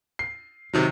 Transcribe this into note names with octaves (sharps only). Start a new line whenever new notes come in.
C7
C3 D#3 F#3